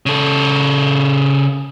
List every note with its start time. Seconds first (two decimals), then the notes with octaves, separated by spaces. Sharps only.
0.06 C#3 A4